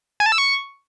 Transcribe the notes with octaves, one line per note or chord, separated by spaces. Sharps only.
G#5
A5
E6
C#6